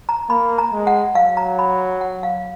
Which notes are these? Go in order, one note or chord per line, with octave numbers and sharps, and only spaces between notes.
A#5
A#3 B5
A#5
G#3
F#5
F#3 F5
A#5
B5
F#5
F5